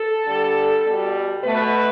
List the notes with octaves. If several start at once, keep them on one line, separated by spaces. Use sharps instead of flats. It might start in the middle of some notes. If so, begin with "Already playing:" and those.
Already playing: A4
D3 G3
B2 G3
B2 A3 B4